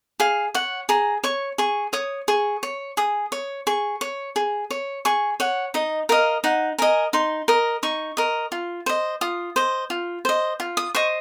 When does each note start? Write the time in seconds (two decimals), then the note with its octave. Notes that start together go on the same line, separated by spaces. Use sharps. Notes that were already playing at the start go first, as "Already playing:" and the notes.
0.20 G#4 F5
0.54 C#5 F#5
0.89 G#4 A#5
1.24 C#5 C#6
1.58 G#4 C#6
1.93 C#5 D#6
2.28 G#4 C#6
2.63 C#5
2.97 G#4 D#6
3.32 C#5
3.67 G#4 C#6
4.01 C#5
4.36 G#4
4.71 C#5
5.05 G#4 C#6
5.40 C#5 F#5
5.74 D#4 D#5
6.09 A#4 D#5 F5
6.44 D#4 F#5
6.78 A#4 D#5 G#5
7.13 D#4 C6
7.48 A#4 D#5
7.83 D#4 C#6
8.17 A#4 D#5
8.52 F4
8.86 C5 D#5
9.21 F4 D#6
9.56 C5 D#5
9.90 F4
10.25 C5 D#5
10.60 F4
10.77 D#6
10.95 C5 D#5 C#6